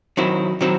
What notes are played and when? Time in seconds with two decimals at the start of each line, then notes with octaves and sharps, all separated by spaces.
0.17 D#3 F#3 C4 E4
0.61 D#3 F#3 C4 E4